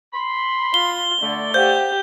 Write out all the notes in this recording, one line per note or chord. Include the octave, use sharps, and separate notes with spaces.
B5 C6
F4 G7
D3 A3 D5
G4 C5 F5 F#5 G6